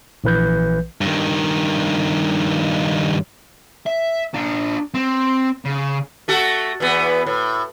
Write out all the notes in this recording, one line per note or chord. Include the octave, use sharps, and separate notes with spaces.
A#1 E3 B4 G6
G2 D#3
E5
D4 F4
C4
C#3
A3 F#4 A4
E2 E3 B3
A2